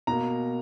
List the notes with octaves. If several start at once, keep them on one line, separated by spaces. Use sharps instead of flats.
B2 A#3 A#5